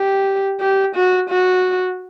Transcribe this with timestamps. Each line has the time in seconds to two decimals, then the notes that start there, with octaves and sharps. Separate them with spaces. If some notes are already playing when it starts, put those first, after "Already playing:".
Already playing: G4
0.60 G4
0.95 F#4
1.29 F#4